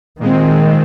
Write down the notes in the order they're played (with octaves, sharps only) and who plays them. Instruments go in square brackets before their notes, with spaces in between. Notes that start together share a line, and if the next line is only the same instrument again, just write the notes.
[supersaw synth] A#2 G#3 C4 [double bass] D#3